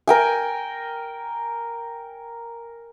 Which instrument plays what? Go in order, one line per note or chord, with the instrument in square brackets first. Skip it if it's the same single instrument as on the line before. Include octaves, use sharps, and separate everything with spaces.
[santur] A#4 G5 G#5